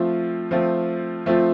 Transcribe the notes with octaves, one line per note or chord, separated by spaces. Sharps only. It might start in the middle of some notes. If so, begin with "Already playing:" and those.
Already playing: F3 A3 C4 F4
F3 A3 C4 F4
F3 A3 C4 F4